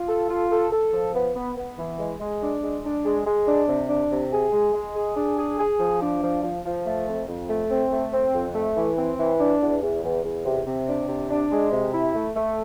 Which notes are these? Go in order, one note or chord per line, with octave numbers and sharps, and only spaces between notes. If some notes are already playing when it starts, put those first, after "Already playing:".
Already playing: F4
A4
F4
A4
A4
F3
B3
B3
B3
E3
G#3
G#3
D4
G#3
D4
G#3
G#3
D4
C3
D4
C3
G#4
G#3
G#3
G#4
D4
G#4
G#4
F3
D4
F3
F3
F3
A3
F2
F2
A3
C4
A3
C4
F2
A3
E3
C4
E3
D4
E2
E2
E2
E2
C3
C3
D4
C3
D4
G#3
C3
E4
A3
A3